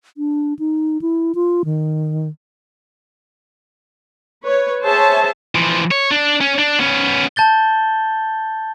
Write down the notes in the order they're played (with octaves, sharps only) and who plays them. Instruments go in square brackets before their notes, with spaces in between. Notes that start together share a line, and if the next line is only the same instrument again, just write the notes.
[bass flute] D4
D#4
E4
F4
D#3
[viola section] B4 C#5
G#4 C5 C#5 E5 A5
[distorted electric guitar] E3 F3
C#5
D4
C#4
D4
B3 C#4
[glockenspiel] A5 G6 A6 G7